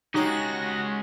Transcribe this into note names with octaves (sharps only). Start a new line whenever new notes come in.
G#3 C#4 D#4 F#4 G4 C#5 A#6